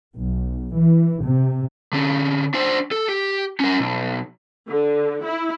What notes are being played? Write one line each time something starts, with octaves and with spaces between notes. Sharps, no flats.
B1
E3
C3
D3 C#4
D4 C5
A4
G4
C#4 A#4
B1
D3
E4